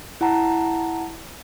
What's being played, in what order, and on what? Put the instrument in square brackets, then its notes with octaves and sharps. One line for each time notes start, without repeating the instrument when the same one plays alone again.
[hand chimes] E4 F#5 A5 A#5